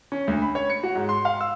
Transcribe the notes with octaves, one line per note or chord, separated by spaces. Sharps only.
C#4
D2
B5
C#5
C#7
F#4
G#2
C6
F5
E6